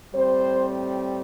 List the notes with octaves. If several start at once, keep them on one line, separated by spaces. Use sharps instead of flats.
A2 G3 C4 C5